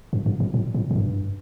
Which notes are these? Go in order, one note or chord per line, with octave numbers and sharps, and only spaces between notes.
G2
G2
A2
A2
A2
A2
G2